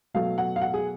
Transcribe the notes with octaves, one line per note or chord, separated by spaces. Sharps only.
B2 F#3 A3 F5
F#5
F5
F#5
G#4